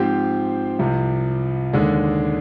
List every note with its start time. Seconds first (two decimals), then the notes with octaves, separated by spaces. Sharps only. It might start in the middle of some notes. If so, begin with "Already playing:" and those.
Already playing: G#2 F3 C4 G4 C5
0.79 C2 C3 F3
1.73 D#2 D3 G#3 D4